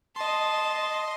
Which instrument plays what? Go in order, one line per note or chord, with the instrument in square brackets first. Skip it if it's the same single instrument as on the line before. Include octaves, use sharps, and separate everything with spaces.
[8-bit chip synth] D#5 C6 [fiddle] A5